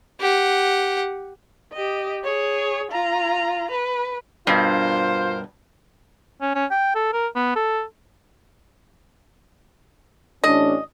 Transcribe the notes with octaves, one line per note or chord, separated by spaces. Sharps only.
G4 F#5
G4 D#5
G#4 C#5
F4 A#5
B4
G2 B2 F4 A#4 C5
C#4
C#4
G5
A4
A#4
B3
A4
A1 C#4 D4 D#5